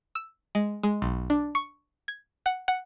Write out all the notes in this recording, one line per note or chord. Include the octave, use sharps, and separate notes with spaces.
E6
G#3
G#3
B1
D4
C#6
G#6
F#5
F#5